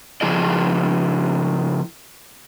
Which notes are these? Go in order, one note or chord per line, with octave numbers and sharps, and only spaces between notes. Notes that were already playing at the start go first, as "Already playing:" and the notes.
C#3 F3 E4 G#4 D5 D#5